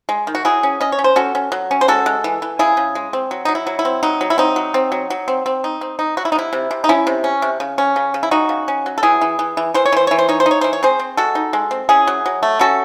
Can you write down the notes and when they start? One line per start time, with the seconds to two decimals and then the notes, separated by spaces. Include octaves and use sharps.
0.09 G#3
0.27 D#3
0.35 F#4
0.45 F#3 E4 G#4
0.63 C#4
0.81 C#4 D#5
0.92 C#5
0.99 C#4
1.04 C5
1.16 C#4 F#4 A4
1.35 C#4
1.52 F#3
1.71 C#4
1.81 C5
1.88 G#3 F#4 A4
2.06 G#3
2.24 E3
2.42 E3
2.59 C#3 E4 G#4
2.77 C#3
2.95 G#3
3.13 C4
3.31 F#3
3.45 F#3 D#4
3.55 E4
3.67 F#3
3.79 E4
3.85 C4
4.03 F#3 D#4
4.21 F#3
4.30 E4
4.38 C4 D#4
4.56 F#3
4.74 C4
4.92 F#3
5.10 F#3
5.28 C4
5.46 C4
5.64 D#4
5.81 C4
5.99 D#4
6.17 F#3 F#4
6.25 E4
6.32 D#4
6.35 C3 E4
6.53 C3
6.71 C3
6.84 D#4
6.89 C#4 E4
7.07 C3
7.24 C#4
7.42 C3
7.60 C#3
7.78 C#4
7.96 C#3
8.14 C#3
8.23 E4
8.31 C#3 D#4 F#4
8.49 C#3
8.68 C#4
8.86 F#3
8.98 A4
9.03 E3 E4 G#4
9.21 E3
9.39 E3
9.57 E3
9.74 E3 C5
9.86 C#5
9.92 E3 C5
10.07 E3 C#5
10.19 C5
10.29 D#4 C#5
10.40 C5
10.46 D#4
10.51 C#5
10.61 E3 C5
10.73 C#5
10.83 C4 G#4 C5
10.99 C4
11.17 G#3 F#4 A4
11.35 D#4
11.53 G#3
11.71 C4
11.89 C#4 E4 G#4
12.07 F#3
12.26 F#3
12.43 A3
12.60 C#4 F#4 A4